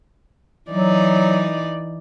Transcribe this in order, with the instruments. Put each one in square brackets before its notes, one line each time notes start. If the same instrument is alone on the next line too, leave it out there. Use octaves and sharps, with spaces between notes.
[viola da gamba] E3 D#4 D5 [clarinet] F#3